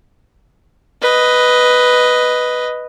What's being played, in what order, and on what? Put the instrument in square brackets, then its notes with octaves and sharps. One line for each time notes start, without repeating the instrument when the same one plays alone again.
[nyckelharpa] B4 D#5